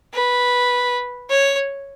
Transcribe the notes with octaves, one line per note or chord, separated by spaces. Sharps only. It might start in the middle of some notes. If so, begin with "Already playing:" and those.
B4
C#5